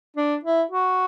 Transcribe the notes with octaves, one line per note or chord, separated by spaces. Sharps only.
D4
E4
F#4